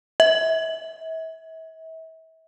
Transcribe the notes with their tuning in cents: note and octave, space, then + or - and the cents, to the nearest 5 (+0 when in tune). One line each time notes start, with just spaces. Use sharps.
E5 -35